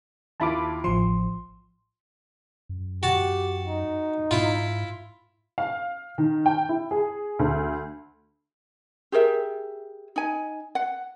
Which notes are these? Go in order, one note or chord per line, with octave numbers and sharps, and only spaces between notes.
D#2 E4 F4 A5 B5 D6
A1 F3 C6
F#2
F#4 G4 A5
D#4
G#2 E4 F4
F5
D#3
G5
E4
G#4
D2
G4 G#4 A#4 E5
D#4 G#5
F#5